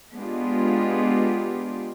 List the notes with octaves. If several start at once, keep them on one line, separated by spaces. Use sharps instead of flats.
G#3 B3 D4 F4 G4